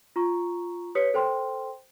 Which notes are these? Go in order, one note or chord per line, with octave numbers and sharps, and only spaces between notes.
F4 A#5 C#6
G4 B4 C#5 D#6 B6 C#7
A4 C5 G5 C6 F6